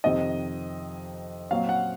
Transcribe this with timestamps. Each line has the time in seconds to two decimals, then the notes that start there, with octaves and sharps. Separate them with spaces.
0.04 F2 C3 D#3 D#5
1.50 A#2 F#3 C4 F5
1.69 F#5